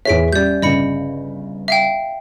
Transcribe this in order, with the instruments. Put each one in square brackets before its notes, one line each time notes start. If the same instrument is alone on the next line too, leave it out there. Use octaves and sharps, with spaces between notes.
[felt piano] E2 G#4 C#5 [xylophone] E5 B6 D7
[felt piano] G3 C#4 [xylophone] D5 G6
[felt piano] G1 C#3 [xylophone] D#5 B5 C#7
[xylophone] E5 F5 G5